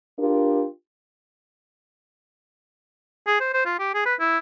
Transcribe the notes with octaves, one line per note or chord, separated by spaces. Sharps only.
D4 F4 G4 A#4
G#4
C5
C5
F4
G4
G#4
B4
E4